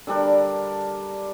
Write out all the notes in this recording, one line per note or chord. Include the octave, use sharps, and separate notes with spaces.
D3 G3 D4 A#4